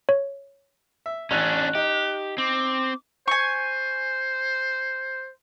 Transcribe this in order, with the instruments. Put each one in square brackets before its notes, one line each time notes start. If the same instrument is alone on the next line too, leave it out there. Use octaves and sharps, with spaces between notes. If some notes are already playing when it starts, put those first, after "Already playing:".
[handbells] C#5
[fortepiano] E5
[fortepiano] A1 [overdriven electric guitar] C#4 D4 [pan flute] F#6
[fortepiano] D#4 [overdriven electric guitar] G4
[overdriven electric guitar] C4 [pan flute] D6
[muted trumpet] C5 [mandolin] G#5 C#6